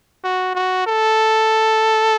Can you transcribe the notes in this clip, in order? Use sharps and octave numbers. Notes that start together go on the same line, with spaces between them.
F#4
F#4
A4